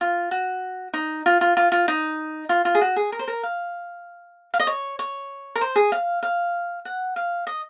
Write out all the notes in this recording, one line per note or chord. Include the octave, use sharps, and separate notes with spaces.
F4
F#4
D#4
F4
F4
F4
F4
D#4
F4
F4
G#4
F#4
G#4
A#4
C5
A#4
F5
F5
D#5
C#5
C#5
A#4
C5
G#4
F5
F5
F#5
F5
D#5